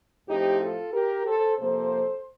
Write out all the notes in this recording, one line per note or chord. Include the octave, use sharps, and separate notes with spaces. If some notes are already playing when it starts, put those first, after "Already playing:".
A2 F3 C4 D#4 G4
F4 A4
G4 A#4
A4 C5
C3 F3 A#3 A4 C5